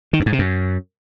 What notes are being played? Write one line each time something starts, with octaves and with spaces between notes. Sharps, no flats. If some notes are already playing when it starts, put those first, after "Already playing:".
D#3
F#2
G#2
C3
F#2